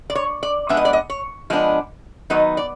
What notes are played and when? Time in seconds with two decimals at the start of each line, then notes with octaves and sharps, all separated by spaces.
0.10 D5
0.15 C#5
0.43 D5
0.69 F3 G#3 B3 D4 E5
0.77 D#5
0.85 D5
0.93 D#5
1.10 C#5
1.50 F3 G#3 B3 D4 D#5
2.30 D#3 F#3 B3 D#4 D#5
2.57 D5